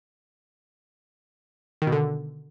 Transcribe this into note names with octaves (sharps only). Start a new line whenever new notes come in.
D#3
B2
D3